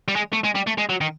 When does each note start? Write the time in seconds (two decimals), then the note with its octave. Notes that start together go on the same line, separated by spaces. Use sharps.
0.08 G3
0.16 G#3
0.33 A3
0.44 G#3
0.55 G3
0.67 A3
0.78 G#3
0.90 F#3
1.01 D#3